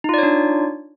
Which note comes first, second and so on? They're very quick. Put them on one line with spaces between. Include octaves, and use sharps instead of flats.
D#4 F4 D5 C#5 D4